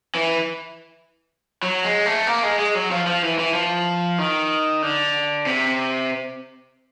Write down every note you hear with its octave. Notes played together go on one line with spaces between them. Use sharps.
E3
F#3
G#3
A3
A#3
G#3
G#3
F#3
F3
F3
E3
E3
F3
D#3
D3
C3